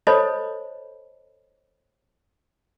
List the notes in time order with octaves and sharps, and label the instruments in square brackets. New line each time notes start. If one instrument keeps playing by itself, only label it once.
[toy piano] A4 C5 C#5 D#5 A5 B5